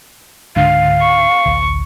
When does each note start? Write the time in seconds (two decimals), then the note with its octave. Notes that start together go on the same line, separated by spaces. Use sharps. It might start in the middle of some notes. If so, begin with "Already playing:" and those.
0.56 C#2 G#2 D3 F5
1.01 C#6
1.45 A1 D2